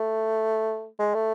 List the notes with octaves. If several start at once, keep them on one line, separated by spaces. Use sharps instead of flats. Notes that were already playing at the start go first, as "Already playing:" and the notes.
Already playing: A3
G#3
A3